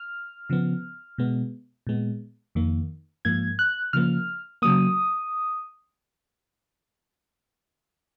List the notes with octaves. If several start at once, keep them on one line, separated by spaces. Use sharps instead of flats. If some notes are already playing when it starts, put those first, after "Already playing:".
Already playing: F6
C#3 F3 B3
B2 G#3 B3
A#2 G#3 B3
F2 D#3 A#3
G#2 F3 A#3 G#6
F#6
C#3 F3 A#3 F6
C#3 F#3 A#3 D#6